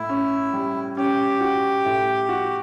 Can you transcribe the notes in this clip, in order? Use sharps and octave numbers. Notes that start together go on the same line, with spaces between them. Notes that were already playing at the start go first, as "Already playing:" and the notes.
Already playing: A2 E4
C#4
G3
C#4 G4
F#4
A2
F#4